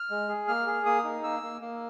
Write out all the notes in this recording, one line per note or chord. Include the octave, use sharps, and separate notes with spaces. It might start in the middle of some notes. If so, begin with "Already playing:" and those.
Already playing: F6
G#3
G#4
A#3 F6
G#4
A#3 D#6
D#4
A#3 E6
A#3
A#3